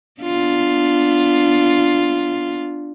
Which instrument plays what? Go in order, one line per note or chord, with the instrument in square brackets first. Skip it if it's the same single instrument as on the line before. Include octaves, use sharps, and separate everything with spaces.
[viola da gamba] B3 D4 F4